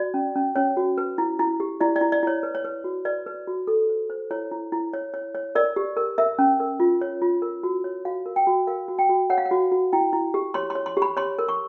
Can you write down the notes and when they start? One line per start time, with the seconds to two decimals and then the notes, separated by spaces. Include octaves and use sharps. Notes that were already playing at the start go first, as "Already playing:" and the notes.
Already playing: F#4 D5
0.14 C#4
0.36 C#4
0.56 C#4 C#5
0.77 F#4
0.98 B4
1.18 E4
1.39 E4
1.60 G4
1.80 E4 D5
1.96 D5
2.01 E4
2.12 D5
2.23 E4 C#5
2.43 B4
2.55 C#5
2.65 B4
2.84 F#4
3.05 B4 D5
3.26 B4
3.47 F#4
3.67 A4
3.89 C5
4.10 C5
4.31 E4 C#5
4.51 E4
4.72 E4
4.93 C#5
5.14 C#5
5.35 C#5
5.55 A#4 D5
5.76 G4
5.97 A#4
6.18 A#4 E5
6.39 C#4
6.60 A#4
6.80 F4
7.01 C#5
7.22 F4
7.42 A#4
7.63 F#4
7.84 C#5
8.05 F#4 F5
8.26 A#4
8.36 G5
8.47 F#4
8.67 A#4 F5
8.88 F#4
8.99 G5
9.09 F#4
9.30 C#5 F#5
9.38 F5
9.45 F#5
9.51 F#4
9.72 F#4
9.93 E4 G5
10.13 E4
10.34 G4
10.54 C#5 C6
10.70 C6
10.75 C#5
10.86 C6
10.97 G4
11.02 B5
11.17 C#5 C6
11.39 A#4
11.48 C#6